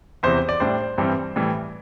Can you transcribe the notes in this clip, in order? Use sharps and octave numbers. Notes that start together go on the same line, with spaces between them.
E2 C3 E3 C5
D5
A2 G3 D4 C5
G2 E3 G3 C4
A2 E3 G3